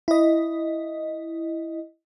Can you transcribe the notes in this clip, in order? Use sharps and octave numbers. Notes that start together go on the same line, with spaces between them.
E4 D#5